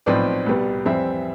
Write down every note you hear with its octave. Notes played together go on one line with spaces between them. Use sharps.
B1 A2 F3 C4 B4 D5
C2 B2 G3 B3
F2 E3 G3 C4 C5 E5